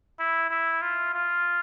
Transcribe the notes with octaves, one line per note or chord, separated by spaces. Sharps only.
E4
E4
F4
F4